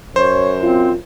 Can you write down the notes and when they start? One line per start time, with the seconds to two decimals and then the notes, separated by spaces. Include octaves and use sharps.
0.16 F#2 C5 C#5
0.62 C4 F4